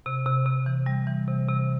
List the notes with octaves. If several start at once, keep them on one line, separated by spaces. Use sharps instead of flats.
C3
C3
C3
E3
G3
E3
C3
C3